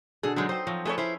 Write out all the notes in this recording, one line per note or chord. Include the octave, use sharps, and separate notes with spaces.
B2 D3 G#4 A4
D3 F#3 G#3 D#4 C5
C4 C5 D#5
F3 F#3 F4
A3 G#4 A4 B4 C#5
C#4 E4 C5